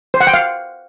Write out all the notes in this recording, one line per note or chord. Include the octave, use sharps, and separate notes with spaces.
C5
F#5
G5
F5